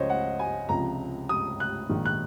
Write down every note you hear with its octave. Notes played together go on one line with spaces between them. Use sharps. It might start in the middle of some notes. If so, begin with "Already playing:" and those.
Already playing: C#2 C#3 F3 C5 C#5 D#5
F#5
G#5
C#2 C3 F3 A#5
D#6
F#6
A#1 G#2 D#3
F#6